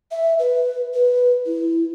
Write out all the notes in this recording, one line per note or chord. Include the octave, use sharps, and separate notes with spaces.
E5
B4
B4
E4